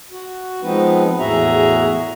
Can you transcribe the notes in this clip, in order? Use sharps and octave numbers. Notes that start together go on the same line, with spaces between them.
F#4
F3 G#3 B3 C4 D#4 B4
E2 A2 F#4 G#4 E5 A#5